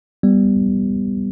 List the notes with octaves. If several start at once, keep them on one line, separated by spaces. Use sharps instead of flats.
G3 B3